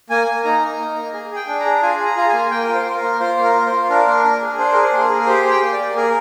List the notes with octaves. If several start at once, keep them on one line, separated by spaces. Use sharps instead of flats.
A#3 G#5
A#3
D#4 A#5
A#3
D#4
A#3
G#4
G#4 G5
D4
A#5
G#4
F4 G#5
G#4
A#5
F4 A#5
A#3 G#5
A#3 G5
A#4
F4
C5
F4
A#4
A#3
F4 C5
A#3
A#4
F4
C5
F4
D4 A#4
A#3
D4
G#4
D4 C5
G#4 A#4
C5
A#3
A#4
G#4
A#4
G4 C5
G4
G5
A#3
D5
A#3
G#4 A#4